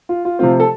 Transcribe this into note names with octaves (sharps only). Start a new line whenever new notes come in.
F4
F4
C3 F3 A3 C4 F4
A4